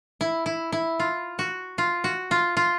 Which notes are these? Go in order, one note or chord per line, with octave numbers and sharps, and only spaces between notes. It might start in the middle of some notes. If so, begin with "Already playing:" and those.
E4
E4
E4
F4
F#4
F4
F#4
F4
F4